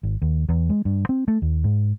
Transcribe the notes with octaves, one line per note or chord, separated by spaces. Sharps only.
G#1
D#2
E2
G#3
G2
C4
A3
D#2
G#2